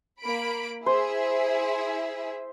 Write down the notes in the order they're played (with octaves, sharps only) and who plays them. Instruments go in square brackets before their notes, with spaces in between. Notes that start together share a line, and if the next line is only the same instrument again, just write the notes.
[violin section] A#3 B5 D7
[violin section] E4 G#4 E5 [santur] C5